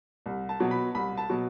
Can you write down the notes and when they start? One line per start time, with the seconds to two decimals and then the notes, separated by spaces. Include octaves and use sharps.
0.26 C2
0.49 A5
0.60 B2 F#3
0.71 B5
0.95 C2 B5
1.17 A5
1.30 B2 F#3